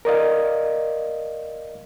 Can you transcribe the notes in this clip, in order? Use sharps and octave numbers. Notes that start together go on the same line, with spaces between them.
A#4 D5 D#5 F5